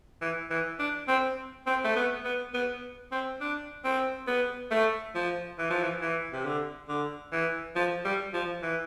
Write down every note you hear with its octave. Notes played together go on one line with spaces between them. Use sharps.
E3
E3
D4
C4
C4
A3
B3
B3
B3
C4
D4
C4
B3
A3
F3
E3
F3
E3
E3
C3
D3
D3
E3
F3
G3
F3
E3